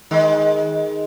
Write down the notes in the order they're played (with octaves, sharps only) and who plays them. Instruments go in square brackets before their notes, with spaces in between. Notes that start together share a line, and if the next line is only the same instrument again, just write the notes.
[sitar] D#3 G#3